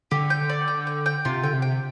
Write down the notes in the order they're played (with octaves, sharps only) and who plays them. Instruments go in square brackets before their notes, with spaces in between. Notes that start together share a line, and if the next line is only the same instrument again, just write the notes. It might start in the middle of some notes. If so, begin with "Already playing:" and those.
[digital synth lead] D3 [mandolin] G4
[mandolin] G5
D5
G5
G5
G5
[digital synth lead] C3 [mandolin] F4
[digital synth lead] D3 [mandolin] G5
[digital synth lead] C3
[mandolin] G5